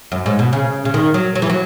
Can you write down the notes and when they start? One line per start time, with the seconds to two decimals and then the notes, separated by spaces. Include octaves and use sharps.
0.12 F#2
0.26 G#2
0.39 B2
0.53 C#3
0.85 C#3
0.94 D#3
1.14 F#3
1.35 F#3
1.42 E3
1.50 F#3